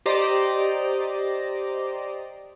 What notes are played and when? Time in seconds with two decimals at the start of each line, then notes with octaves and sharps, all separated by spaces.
0.06 G4 C5 D5 D#5 A#5 D6